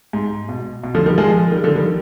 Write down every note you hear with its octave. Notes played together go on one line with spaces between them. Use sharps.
G#2
B2
B2
D3 F3
D#3 G3
F3 G#3
D#3 G3
D3 F3
D#3 G3